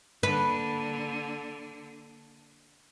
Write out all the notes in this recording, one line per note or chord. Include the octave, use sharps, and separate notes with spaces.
D3 A#3 B4